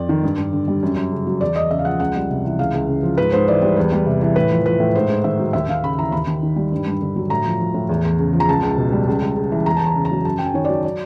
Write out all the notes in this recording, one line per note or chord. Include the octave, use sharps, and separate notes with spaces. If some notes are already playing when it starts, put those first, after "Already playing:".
Already playing: F2 F3 D5
D#3
G2
G2
D3
G3
F#2
F#2
C#3
F#3
E2 D5
E2 D#5
C#3 E5
F5
F3 F#5
C#2 F#5
G3
C3
E3
C#2 F5
C#2
C#3
F3
G#2 B4
G#2 C5
E3 D5
G3
E2 B4
G3
C3
E3
A2 B4
F3
F3 B4
A2
G#2 C5
G#2
D#3 E5
F#3
D#2 E5
D#2 F5
C#3 B5
E3 A#5
D#2 B5
D#2
D#3
G3
G2
G2
D3
F#3
A2 A#5
F3
F3
A2
E2
E2
C#3
F3
A#5
C#2 A5
C#2
B2
G3
C#2
C#2
C#3
E3
E2 A#5
E2 A5
A#5
C#3
A#5
F#3
F#2 A5
F#2 G5
G#5
D#3 C#5
F#3 D5
D5